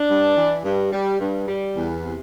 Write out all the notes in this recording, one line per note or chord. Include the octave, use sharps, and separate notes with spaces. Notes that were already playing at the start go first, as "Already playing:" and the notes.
Already playing: D4
G2
E3
G2
G3
G2
G3
E2
C3